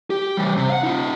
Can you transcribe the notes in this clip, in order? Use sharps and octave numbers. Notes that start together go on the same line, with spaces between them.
G4
E3 G3
C3
F5 F#5
D#4 F4